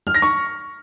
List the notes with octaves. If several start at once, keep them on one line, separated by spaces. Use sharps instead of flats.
F6
A#6
C#6